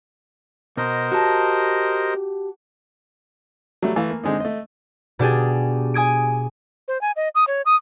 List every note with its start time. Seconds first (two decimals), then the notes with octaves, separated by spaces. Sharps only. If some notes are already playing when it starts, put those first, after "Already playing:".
0.77 B2 A#4 C5 D#5
1.11 F#4 G4 A5
3.83 F#3 G3 A3
3.96 E3 A3 F5
4.10 A#3
4.23 D3 G#3 C4 D#4
4.40 A3 D#5
5.19 B2 D4 G4 G#4
5.94 G#5 D#6 G#6 D7
6.88 C5
7.01 G#5
7.16 D#5
7.35 D#6
7.48 C#5
7.66 D#6